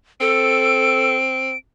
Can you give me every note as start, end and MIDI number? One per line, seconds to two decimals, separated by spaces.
0.20 1.52 60
0.20 1.15 69
0.20 1.57 98